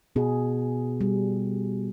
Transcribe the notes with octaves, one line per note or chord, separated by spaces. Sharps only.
B2 G#4
G3